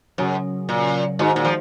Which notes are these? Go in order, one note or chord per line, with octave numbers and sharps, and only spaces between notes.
F#2 C#3 F#3 C#4
A#2
G#2 D#3 G#3 D#4 F#4 C5
A#2
F3